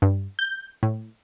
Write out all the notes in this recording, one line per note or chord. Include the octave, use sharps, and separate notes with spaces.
G2
G6
A2